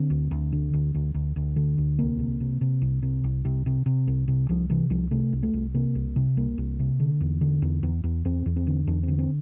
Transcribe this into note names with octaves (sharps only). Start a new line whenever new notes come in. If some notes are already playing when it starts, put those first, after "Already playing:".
Already playing: D3 C4
D2
D2
D3
D2
D2
D2
D2
D3
D2
C2 A#3
C3
C3
C3
C2
C3
C2
C3
C3
C3
C2
C3
C2 F3
C3 E3
C2 F3
C3 A3
C2
A3
C2
C3 A#3
C2
C3
C2 A#3
C2
C3
D3
E2
D3
E2
E2
E2
E2 C4
E2
C4
D3
E2 D4
D3 C4
C4